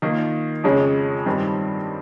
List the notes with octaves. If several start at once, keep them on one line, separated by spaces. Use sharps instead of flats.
D#3 A#3 F4
F2 C#3 G#3 C#4
G2 D#3 G3 C4